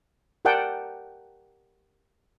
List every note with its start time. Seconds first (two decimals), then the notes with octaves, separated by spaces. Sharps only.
0.45 G4 A#4 D5 F#5 G5 A5